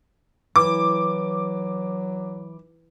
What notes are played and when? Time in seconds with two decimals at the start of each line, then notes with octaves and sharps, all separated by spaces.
0.56 E3 F#3 D6